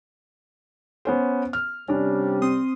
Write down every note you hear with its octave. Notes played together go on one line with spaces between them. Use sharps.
B3 C#4 C5
F6
C3 G3 C#4 D4
C4 C6 D#6